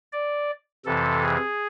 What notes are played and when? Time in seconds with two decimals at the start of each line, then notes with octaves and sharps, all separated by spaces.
0.13 D5
0.85 F2 C3 E3 A4
1.23 G#4